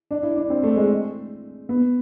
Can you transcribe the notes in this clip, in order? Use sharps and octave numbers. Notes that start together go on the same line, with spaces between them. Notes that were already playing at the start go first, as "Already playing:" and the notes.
D4
E4
D4
C4
A3
G#3
B3